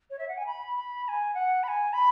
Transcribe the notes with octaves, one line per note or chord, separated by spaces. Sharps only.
C#5
E5
F#5
G#5
B5
B5
B5
G#5
F#5
B5
G#5
B5